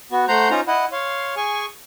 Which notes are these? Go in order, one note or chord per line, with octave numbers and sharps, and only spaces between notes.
B3 F#4
A3 C5 F#5 A#5 C6 G6
C#4 D#4 F4 C5 A#5
E4 D#5 F#5
C#5 F5 C6
G#4 G#5 C#6